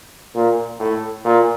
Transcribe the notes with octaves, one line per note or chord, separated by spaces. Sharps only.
A#2
A2
A#2